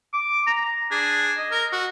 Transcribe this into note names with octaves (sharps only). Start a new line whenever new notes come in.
D6
A#5
D4 G#4
D#5
A#4
F#4